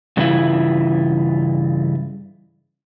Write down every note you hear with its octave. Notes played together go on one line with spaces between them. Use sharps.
G2 C#3 E3 A#3 E4 F4